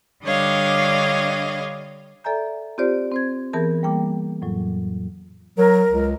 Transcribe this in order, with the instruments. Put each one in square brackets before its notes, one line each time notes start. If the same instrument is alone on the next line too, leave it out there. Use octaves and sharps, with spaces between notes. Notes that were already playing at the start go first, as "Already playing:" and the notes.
[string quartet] D3 G3 D4 C#5 D#5 F5
[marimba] A4 D5 E5 G#5 A#5 G6
C4 F4 G4 C5 D5
C4 C5 G#6
E3 B3 G#4 A#4 A5 G6
G3 A#3 G5 D6
F2 A2 F#3
[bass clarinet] F#3 [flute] A#4
[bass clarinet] C#2